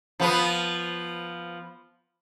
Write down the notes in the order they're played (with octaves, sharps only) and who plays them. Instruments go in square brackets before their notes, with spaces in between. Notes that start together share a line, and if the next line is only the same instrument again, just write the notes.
[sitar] F3 B3